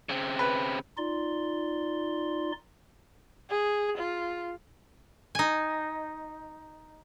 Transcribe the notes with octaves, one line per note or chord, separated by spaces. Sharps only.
C#3 C4
B4
D#4 F4 D5 C6
G#4
F4
D#4 G#5